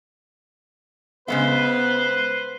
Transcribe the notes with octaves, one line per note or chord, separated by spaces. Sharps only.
C#3 G#3 B3 B4 C5 E5